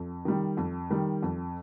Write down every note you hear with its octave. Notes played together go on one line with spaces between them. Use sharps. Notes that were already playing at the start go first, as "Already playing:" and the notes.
Already playing: F2
D#3 G3
F2
D#3 G3
F2